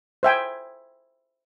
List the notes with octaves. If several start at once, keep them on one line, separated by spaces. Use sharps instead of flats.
C5 E5 G5 G#5